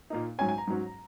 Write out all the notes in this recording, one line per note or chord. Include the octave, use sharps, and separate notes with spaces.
A#2 A#3 D#4
G#2 F#3 C#4 G#5
G#5
A#5
G#2 F#3 C#4